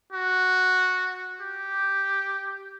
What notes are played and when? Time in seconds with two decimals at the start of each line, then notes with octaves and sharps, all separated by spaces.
0.13 F#4
1.41 G4